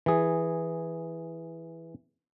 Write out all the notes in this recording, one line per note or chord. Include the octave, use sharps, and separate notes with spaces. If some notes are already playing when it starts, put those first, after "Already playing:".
E3 G#4